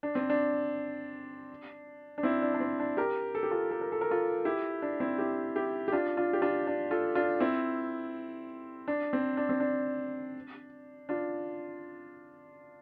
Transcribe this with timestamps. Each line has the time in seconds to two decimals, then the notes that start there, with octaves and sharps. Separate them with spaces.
0.03 D4
0.15 C4
0.30 D4
2.18 D4
2.23 C4 E4
2.42 D4
2.54 D4
2.60 C4
2.80 D4
2.97 G4 A#4
3.35 A4
3.43 G4
3.51 F4 A4
3.71 A4
3.81 A#4
3.92 A4
4.01 A#4
4.11 F4 A4
4.45 E4 G4
4.82 D4
5.00 C4 E4
5.18 E4 G4
5.56 E4 G4
5.88 G4
5.92 D4 F4
6.17 D4 F4
6.33 G4
6.42 D4 F4
6.67 D4
6.91 F4 A4
7.15 D4 F4
7.40 C4 E4
8.88 D4
9.13 C4
9.37 D4
9.49 C4
9.60 D4
11.09 D4 F4